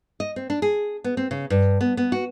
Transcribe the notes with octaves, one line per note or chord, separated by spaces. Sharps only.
D#5
C4
D4
G#4
B3
C4
C#3
G2
B3
B3
F#4